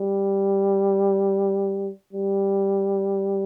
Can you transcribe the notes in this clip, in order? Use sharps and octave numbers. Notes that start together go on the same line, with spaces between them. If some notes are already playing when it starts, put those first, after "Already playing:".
Already playing: G3
G3